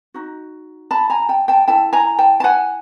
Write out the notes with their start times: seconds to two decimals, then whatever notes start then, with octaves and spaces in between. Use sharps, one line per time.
0.14 D#4 F#4
0.91 A5 B5
1.10 G#5 A#5
1.29 G5 A5
1.48 G5 A5
1.68 E4 A4 G5 A5
1.93 G#5 A#5
2.19 G5 A5
2.40 A5
2.44 F#5 G#5